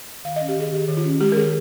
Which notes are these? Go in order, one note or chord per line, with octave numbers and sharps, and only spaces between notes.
D#3 F5
C#4 D#5
G4
D#3 G#4
D#3 G4
D#3
F4
C#4
G#3 G4
A#4
D#3 G#4